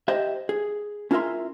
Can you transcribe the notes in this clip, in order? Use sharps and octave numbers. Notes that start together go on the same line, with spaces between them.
G4 C5 D#5 E5
G#4
C#4 E4 F4 A#4 E5 C6